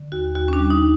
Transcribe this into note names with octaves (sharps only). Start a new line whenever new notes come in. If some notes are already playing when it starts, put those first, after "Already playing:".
Already playing: D3
D#2 F#4
D#2 F#4
C#4
D4
G3
D#4